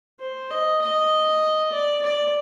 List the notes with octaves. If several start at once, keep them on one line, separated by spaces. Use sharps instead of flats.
C5
D#5
D#5
D5
D5